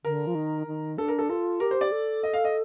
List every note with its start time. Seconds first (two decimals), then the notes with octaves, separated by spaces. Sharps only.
0.04 D3 A#4
0.27 F3
0.35 D#3
0.67 D#3
0.98 D4 A4
1.08 A#4
1.19 A4
1.29 F4 A4
1.60 G4 A#4
1.71 C5
1.81 D5
1.92 A4
2.23 D#5
2.33 F5
2.45 D#5